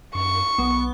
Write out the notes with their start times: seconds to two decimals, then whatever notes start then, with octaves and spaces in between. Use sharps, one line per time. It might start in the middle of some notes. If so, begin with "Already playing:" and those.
0.15 F#2 C#6
0.58 B1 B3